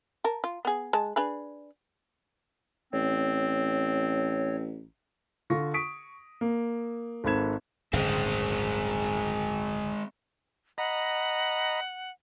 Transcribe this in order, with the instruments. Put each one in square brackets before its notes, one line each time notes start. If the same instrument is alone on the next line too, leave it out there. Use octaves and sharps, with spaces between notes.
[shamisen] A#4 A5
F4
B3 G#4
G#3 A5
D4 G#4 B4
[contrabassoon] A1 [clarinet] C4 [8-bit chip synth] C#5
[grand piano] D3 F4 C#6 A#6
C#6 D#6 B6 D7
A#3
G#1 G#2 A4 B5 G#6 E7
[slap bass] D1 G1 C#3 [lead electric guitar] G#3 C4
[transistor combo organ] D#5 A#5 B5 [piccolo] F#5